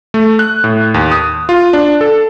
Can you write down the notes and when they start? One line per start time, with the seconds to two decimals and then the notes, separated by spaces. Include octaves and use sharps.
0.14 A3
0.39 F#6
0.64 A2
0.94 D#2
1.12 D#6
1.49 F4
1.73 D4
2.01 A4